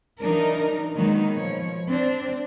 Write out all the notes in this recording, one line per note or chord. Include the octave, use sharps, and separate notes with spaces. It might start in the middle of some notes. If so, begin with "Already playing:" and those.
E3 F#3 D4 D#4 A#4
D#3 F#3 G#3 A#3 B3 D#4
B2 F3 C#5
C4 D4